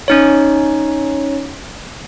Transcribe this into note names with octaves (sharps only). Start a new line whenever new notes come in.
C#4 D#4 C#5